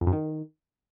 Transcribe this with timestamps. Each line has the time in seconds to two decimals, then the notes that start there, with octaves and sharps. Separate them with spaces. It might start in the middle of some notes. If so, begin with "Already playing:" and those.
0.01 F2
0.07 F#2
0.12 D#3